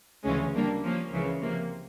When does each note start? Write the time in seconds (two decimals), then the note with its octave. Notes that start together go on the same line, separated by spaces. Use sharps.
0.25 D2 C#3 E3 G#3 C#4
0.53 G3 A#3 D4
0.83 F3 A#3 C#4
1.11 C#2 C#3 E3 G#3
1.41 C3 F3 A#3